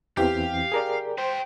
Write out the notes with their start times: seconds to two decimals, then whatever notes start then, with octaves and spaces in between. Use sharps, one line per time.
0.17 E2 E3 C4 G4 F5
0.72 G#4 A#4 D5
1.18 B4 C5 G5